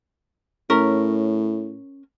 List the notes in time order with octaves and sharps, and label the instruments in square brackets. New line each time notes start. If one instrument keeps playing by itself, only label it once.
[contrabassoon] A2 [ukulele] C#4 A#4